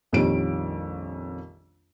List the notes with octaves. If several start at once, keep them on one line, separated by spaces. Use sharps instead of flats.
A#1 F2 D#3 G3 C#4 D7